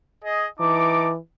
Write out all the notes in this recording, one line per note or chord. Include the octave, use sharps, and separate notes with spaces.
G#4 D#5
E3 D#4 A5 D6